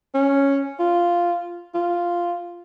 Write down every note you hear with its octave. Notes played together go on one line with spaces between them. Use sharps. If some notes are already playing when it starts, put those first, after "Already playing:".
C#4
F4
F4